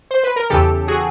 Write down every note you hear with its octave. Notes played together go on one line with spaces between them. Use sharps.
C5
B4
A#4
E2 C#3 E3 G4 A4
F#4 G#4